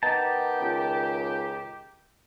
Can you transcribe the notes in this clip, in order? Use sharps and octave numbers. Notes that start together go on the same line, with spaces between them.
D#3 B3 G4 D#5 A5 A#5 G6
C#2